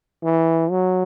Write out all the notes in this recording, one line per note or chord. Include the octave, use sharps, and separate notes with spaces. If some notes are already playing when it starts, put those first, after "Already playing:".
E3
F#3